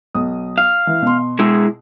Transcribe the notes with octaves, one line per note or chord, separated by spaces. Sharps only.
B1 D#6
F5
E3
B2 C6
G#3 E4 G#4